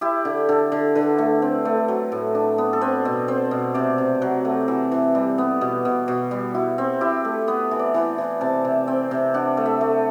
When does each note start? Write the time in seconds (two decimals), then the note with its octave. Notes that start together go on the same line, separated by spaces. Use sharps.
0.01 E4 G4
0.25 D3
0.49 D3 A4
0.72 D3
0.95 D3 B4
1.18 A3
1.42 C4
1.65 A3
1.88 F#3
2.12 A2
2.35 D4
2.58 B3
2.73 A4
2.81 C4 B4
3.05 B2
3.28 C4 C5
3.51 B2
3.74 C3 D5
3.98 C3
4.22 F#3 F#5
4.45 A3
4.68 E3 E5
4.91 E3
5.15 G3
5.38 B3
5.61 B2
5.85 B2
6.08 B2
6.31 G3
6.54 E4 F#4
6.78 C4
7.01 E4 G4
7.25 A3
7.48 B3 B4
7.71 E3
7.79 D5
7.94 E3
8.18 E3
8.41 C3 A5
8.65 C3
8.87 C4 G5
9.11 C3
9.34 D4 F#5
9.57 A3
9.66 E5
9.81 A3